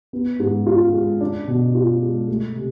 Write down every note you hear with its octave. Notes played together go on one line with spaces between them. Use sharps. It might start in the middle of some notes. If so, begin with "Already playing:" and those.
B3
G#2
F4
G#3
D4
B2
F4
G#3
A3
C3